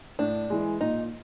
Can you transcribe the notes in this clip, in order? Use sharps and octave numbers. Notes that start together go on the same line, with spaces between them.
A2 D4
E3 G#3
A#2 D#4